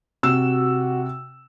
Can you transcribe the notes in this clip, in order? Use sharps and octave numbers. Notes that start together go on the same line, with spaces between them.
C3 F#4 E6 E7